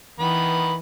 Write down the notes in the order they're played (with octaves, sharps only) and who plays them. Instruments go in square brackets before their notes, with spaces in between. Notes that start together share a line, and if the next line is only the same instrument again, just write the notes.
[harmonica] D#3 B3 B5 [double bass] E3